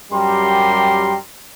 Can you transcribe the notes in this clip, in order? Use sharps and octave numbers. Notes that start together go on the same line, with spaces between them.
F#2 G3 G4 A#4 C6